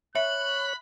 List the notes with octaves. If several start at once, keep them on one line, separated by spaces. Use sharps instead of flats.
C#5 E5 B5 F#6